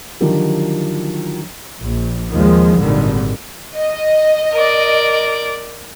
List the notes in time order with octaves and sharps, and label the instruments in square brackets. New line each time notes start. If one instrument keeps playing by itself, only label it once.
[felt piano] D3 D#3 F3 F#3 G4
[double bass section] A#1
D#2 D#3 F3 G#3
G#1 A#2 D3 D#3 G3
[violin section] D#5
[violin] A#4 D5